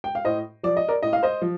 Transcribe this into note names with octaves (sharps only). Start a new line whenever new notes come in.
G5
F5
A2 C5 D#5
F3 D5
D#5
A#4 D5
A2 D#5
F5
C5 D#5
F3